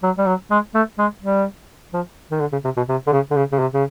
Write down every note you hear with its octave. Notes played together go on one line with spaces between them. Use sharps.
F#3
G3
F#3
G#3
A3
G#3
G3
F3
D#3
D3
C#3
C3
B2
C3
D3
C#3
D3
C#3
C#3
C3
C#3